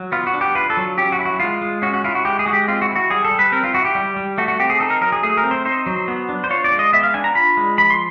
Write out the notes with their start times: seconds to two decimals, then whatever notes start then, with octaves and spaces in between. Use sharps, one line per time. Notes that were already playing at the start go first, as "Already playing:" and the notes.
Already playing: F#3
0.12 B3 F4
0.27 F#4
0.34 D4
0.41 G4
0.55 F4 B4
0.70 A4
0.77 F#3
0.98 C#4 G4
1.12 F#4
1.19 E4
1.25 F#4
1.40 G#3 F4
1.62 G#3
1.82 C#4 F#4
1.94 F#4
2.04 E4 F4
2.15 F#4
2.25 G#3 G4
2.39 G#4
2.46 G#3 F#4
2.53 G4
2.68 C4 F4
2.82 F#4
2.89 E4
2.96 F#4
3.10 G3 G#4
3.25 A4
3.31 G3
3.39 B4
3.52 C4 A#4
3.64 F4
3.73 E4 F#4
3.85 G4
3.95 G3
4.17 G3
4.38 A3 F#4
4.48 F#4
4.59 C4 G4
4.70 G#4
4.80 D#4 A4
4.90 A#4
5.01 F#3 A#4
5.12 G#4
5.23 A3 G#4
5.37 A#4
5.43 C4
5.51 C5
5.65 D#4 C5
5.86 F#3
6.08 B3
6.29 D4
6.44 C5
6.50 F4 C#5
6.64 D5
6.72 G#3
6.79 D#5
6.93 B3 E5
7.03 F5
7.14 D4 G#5
7.24 A#5
7.35 F4 B5
7.57 G#3
7.78 F3 B5
7.90 C6